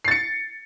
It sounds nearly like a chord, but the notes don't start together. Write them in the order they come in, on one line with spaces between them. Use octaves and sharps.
C7 A6 C#7